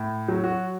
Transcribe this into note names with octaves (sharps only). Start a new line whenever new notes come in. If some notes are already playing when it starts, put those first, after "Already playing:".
Already playing: A2
F#3
F#4